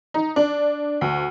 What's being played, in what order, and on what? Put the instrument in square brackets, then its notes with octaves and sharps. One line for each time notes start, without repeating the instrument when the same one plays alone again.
[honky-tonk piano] D#4
D4
D2